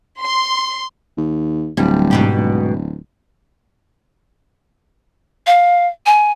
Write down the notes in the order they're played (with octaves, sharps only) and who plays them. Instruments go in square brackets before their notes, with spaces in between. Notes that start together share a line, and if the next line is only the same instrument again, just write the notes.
[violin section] C6
[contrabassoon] D#2
[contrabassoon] D1 [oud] G3
[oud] G#2 B2 G4
[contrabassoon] D1
[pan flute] F5
G#5